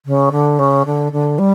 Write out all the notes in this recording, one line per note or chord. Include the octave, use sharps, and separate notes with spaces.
C#3
D3
C#3
D3
D3
G3